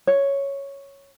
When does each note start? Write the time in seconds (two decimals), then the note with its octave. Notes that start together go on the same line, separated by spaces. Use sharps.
0.07 C#5